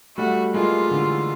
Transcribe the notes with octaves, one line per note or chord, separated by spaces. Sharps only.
G3 A3 F#4
G#3 A#3 F4
D3 E3